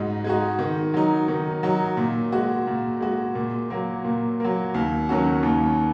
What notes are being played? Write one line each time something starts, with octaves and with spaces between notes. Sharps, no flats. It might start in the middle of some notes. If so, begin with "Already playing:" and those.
Already playing: G#2 G#3 D#4 F#4
G#3 D#4 F#4
D#3
F#3 D#4
D#3
F#3 D#4
A#2
G#3 F#4
A#2
G#3 F#4
A#2
F#3 A#3
A#2
F#3 A#3
D#2
D#3 F#3 C#4 F#4
D#2